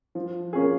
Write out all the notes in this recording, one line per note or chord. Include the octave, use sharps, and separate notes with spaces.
F3
A#3 C#4 F4 G#4